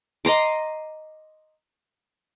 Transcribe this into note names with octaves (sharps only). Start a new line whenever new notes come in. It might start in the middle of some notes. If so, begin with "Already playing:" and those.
D#5 A#5 C6 D6